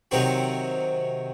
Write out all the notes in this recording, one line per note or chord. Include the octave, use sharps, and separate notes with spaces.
C3 D#3 F#3 C4 F#4